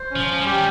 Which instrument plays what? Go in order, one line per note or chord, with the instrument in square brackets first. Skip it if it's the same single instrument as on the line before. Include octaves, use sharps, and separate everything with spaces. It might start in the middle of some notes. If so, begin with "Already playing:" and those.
Already playing: [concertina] C5
[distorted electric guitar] F3 [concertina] C#4
[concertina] C#4
[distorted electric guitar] G3
[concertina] G4
[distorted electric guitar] D#3